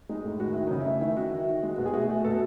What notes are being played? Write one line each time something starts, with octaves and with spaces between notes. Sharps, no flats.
G#3 D#4
A2
D#3 F#4
D#3 E4
C#3 D#4
E4
A3
D#3 E4
D#3 F#4
D#3
D#3
G#3
B2
G#4
A3 F#4
A3
B2 A4